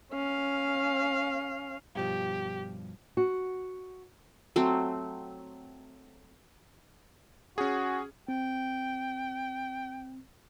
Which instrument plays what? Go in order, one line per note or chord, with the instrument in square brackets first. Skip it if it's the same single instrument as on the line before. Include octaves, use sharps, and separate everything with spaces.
[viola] C#4 F5
[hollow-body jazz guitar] G2 B2 F3 [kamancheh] G4
[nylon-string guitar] F#4
[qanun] F#3 A3 C4
[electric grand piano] C#4 G#4 [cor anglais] F#4
[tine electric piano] C4 [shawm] G5